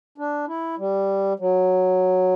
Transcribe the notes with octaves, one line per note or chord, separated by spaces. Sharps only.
D4
E4
G3
F#3